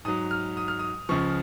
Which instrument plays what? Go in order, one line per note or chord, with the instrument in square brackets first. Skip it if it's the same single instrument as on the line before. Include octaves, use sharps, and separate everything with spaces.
[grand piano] G#2 F#3 D#6
F6
D#6
F6
D#6
C#2 C#3 F3 C#6